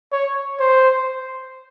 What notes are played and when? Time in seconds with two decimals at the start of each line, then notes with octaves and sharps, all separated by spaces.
0.12 C#5
0.60 C5